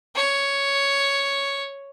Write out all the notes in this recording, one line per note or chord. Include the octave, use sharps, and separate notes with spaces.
C#5